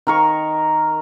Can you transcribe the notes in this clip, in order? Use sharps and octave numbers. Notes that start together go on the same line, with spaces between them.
D#3 A#4 C#6